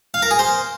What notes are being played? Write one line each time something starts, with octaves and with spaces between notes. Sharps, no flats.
F5
A#4
G#4
C5